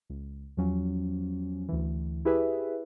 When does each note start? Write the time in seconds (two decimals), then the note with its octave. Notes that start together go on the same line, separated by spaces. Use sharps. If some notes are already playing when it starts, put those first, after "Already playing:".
0.10 C#2
0.57 E2 F3 F#3 C#4
1.69 D2 E3
2.25 E4 G4 G#4 B4 E5